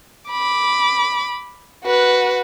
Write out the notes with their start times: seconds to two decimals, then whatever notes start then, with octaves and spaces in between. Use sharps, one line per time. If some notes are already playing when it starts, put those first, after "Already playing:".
0.30 B5 D6
1.85 F#4 B4